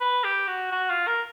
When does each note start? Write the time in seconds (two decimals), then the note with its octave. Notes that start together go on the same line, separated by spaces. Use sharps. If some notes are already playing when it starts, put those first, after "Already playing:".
0.01 B4
0.24 G4
0.48 F#4
0.72 F#4
0.90 F4
1.07 A#4